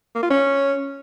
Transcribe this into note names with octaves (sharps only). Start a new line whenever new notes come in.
A#3
F4
C#4